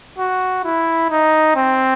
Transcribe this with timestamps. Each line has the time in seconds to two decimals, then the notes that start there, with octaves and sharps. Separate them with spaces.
0.19 F#4
0.64 E4
1.10 D#4
1.56 C4